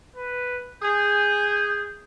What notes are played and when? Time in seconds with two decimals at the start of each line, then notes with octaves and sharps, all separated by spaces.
0.16 B4
0.82 G#4 G6